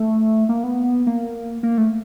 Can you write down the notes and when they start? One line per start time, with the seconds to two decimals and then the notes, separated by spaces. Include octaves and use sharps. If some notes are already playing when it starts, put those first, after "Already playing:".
Already playing: A3
0.49 A#3
0.64 B3
1.07 A#3
1.63 A#3
1.78 A3